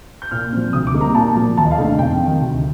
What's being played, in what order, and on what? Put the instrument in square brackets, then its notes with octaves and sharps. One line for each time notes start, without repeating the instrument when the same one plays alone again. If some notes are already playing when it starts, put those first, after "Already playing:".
[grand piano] G6
A#2 F6
F3 C4
D2 D#6
D6
C3 G3 A#3 D#4
A#5
A#2 A5
F3 A#3
D#2 A5
D#5
F5
D3 A3 D#4
F5
F2 G5
C3
D#3
D2